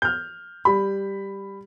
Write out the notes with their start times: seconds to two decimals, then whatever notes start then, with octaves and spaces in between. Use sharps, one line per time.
0.02 F6 G6
0.65 G3 B5